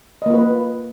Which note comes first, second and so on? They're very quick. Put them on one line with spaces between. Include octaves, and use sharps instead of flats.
D#5 A#3 F4 B4